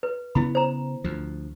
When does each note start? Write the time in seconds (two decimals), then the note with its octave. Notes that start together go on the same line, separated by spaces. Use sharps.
0.03 B4
0.35 C#3 B3 E4 B5
0.55 C5 A#5
1.04 D2 F3